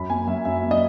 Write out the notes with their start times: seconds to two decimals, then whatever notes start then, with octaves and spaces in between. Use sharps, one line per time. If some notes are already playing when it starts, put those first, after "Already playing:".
Already playing: F#2 B5
0.10 A#3 G#5
0.27 F#2 E5
0.45 F#2 E5
0.63 A#3
0.71 D#5